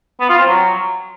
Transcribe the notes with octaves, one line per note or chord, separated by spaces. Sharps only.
B3
F4
C4
F#3